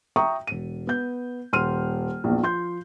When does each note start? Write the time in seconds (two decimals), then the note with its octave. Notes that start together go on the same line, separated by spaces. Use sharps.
0.16 E5 G5 A#5 C#6 D#6
0.47 E1 D#7
0.87 B3 G6
1.53 D#1 C6 F6 D#7
2.24 A#1 E2
2.43 F3 C6 G6